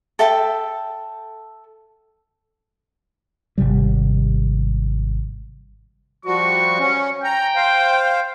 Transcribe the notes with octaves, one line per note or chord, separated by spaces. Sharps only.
A4 E5 G5 A5
G#1 C#2 C3 G3
F3 G3 F#4 C#6
C#4
G5 A#5
C5 F5